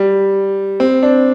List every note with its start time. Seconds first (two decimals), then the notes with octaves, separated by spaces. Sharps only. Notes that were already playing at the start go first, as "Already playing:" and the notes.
Already playing: G3
0.80 C4
1.03 D4